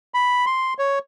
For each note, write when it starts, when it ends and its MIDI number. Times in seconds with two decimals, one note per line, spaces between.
0.14 0.45 83
0.46 0.74 84
0.79 0.99 73